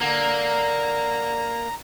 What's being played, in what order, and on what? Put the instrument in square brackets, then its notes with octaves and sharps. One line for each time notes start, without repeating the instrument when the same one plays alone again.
[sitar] D3 [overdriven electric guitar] A#3 [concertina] A#5